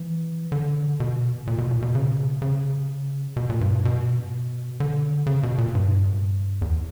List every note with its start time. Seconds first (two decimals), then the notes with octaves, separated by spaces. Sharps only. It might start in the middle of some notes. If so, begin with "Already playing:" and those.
Already playing: E3
0.52 D3
1.00 B2
1.47 A#2
1.58 B2
1.71 A#2
1.82 B2
1.95 C#3
2.42 C#3
3.36 B2
3.50 A#2
3.61 G2
3.85 B2
4.80 D3
5.26 C#3
5.43 B2
5.58 A#2
5.75 G2
6.62 E2